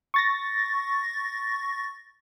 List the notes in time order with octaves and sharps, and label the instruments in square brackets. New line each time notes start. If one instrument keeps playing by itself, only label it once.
[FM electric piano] C#6 A6 A#6